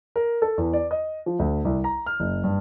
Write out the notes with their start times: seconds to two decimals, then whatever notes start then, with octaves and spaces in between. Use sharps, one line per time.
0.16 A#4
0.42 A4
0.58 E2
0.73 D5
0.91 D#5
1.26 F3
1.39 D2
1.65 C2
1.84 A#5
2.06 F6
2.20 F#1
2.44 G2